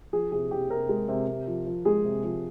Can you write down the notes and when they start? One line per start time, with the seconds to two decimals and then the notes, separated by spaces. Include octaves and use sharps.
0.13 F3 G#4
0.32 C3 G#4
0.51 C3 G4
0.70 C3 A#4
0.89 G#3
1.08 C3
1.28 C3
1.47 F3
1.67 F3
1.85 G#3 G#4
2.04 C3
2.24 F3